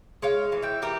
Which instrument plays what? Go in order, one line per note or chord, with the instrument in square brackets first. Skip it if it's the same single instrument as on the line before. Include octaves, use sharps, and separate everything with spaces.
[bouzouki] G#3 C#5 F5
E3
E5 G5
E3 G4 A#4